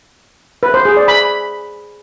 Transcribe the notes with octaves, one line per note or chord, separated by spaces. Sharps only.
B4
C5
G#4
D5
B5